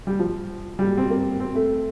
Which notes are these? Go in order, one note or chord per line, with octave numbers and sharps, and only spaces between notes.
G3
F3
G3
C4
A#3
C4
A3